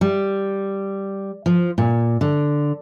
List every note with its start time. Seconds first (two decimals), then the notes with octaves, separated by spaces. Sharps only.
0.01 G3
1.46 F3
1.78 A#2
2.21 D3